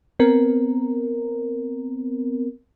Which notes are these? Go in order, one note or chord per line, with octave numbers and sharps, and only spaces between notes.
B3 C4 A#4